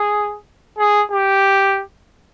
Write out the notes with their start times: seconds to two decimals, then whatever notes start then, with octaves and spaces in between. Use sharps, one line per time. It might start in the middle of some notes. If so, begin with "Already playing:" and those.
Already playing: G#4
0.78 G#4
1.11 G4